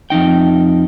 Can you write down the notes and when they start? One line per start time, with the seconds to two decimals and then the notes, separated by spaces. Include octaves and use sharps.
0.10 F2 E3 D#4 G5